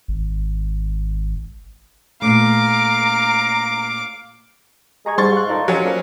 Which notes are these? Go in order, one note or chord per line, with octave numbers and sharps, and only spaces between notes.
G#1
A#2 A3 F5 A#5 D6
G#3 G#4 A#5 C#6 G#6
G#2 G3 C6 C#6 A6
F5 F#6
A#2 D#4 A4 A#4 F5
F#3 C#4
F3 G3 A#3